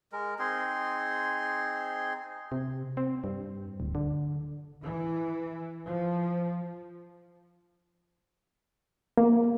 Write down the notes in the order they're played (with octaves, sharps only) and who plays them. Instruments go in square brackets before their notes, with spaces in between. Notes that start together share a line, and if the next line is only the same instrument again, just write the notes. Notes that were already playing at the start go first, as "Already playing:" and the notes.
[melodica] G#3 A#4
C4 D#4 G#4 C6
[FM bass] C3
C4
G2
D1
D3
[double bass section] E3
F3
[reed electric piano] A#3